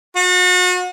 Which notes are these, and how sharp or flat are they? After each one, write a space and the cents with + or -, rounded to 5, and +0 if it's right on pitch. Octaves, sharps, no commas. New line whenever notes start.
F#4 -35